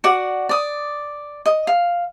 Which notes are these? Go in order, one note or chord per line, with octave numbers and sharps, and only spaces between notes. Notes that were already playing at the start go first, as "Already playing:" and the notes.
F#4 D5 F#5
D5 D#6
D#5
F5